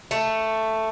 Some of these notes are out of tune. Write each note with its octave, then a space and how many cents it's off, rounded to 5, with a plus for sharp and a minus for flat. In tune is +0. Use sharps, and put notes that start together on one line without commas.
A3 +5